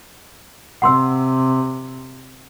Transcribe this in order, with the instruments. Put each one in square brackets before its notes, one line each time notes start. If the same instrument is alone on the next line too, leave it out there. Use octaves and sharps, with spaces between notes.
[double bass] C3 [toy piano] F#5 C6 E6